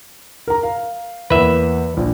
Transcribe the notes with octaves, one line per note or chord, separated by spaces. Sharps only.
A#4 A#5
F5
E2 A#3 B4 E5
A#1 D4